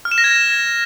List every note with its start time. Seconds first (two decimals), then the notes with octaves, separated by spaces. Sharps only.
0.05 F6
0.12 E7
0.18 A#6
0.24 G#6